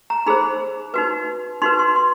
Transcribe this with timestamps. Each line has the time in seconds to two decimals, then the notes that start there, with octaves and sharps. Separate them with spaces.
0.10 A#5
0.26 D#4 G#4 C5 B5
0.94 D#4 F#4 B4
1.62 D#4 F#4 B4 C6
1.79 C6
1.96 C6